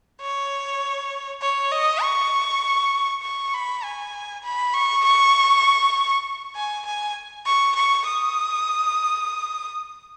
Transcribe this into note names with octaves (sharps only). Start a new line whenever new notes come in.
C#5
C#5
D#5
C#6
C#6
B5
G#5
B5
C#6
C#6
G#5
G#5
C#6
C#6
D#6